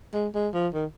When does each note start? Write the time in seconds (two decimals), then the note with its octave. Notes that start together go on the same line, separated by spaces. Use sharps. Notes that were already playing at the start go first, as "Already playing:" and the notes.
0.14 G#3
0.35 G#3
0.54 F3
0.74 D#3